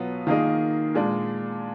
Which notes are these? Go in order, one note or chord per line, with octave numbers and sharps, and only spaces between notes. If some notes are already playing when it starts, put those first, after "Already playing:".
Already playing: B2 F#3 B3 F4
D#3 A#3 F4 G#4 D#5
A#2 G#3 D4